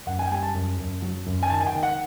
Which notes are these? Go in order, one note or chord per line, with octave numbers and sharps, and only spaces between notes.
F#2 F#5
G#5
G5
G3 G#5
A5
F#2
F#2
F#3
F#2
G#5
D#3 A5
G#5
G5
D#3
F#5